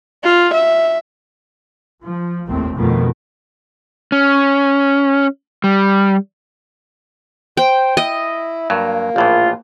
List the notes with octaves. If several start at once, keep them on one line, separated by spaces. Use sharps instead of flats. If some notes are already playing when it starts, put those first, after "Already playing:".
F4
E5
F3
F1 A#1 D#2 A2 A3 C4
F2 B2 D#3 F3 A3
C#4
G3
C5 G5
E4 D#5
G2 F#3 A#3
A#1 A2 E3 F4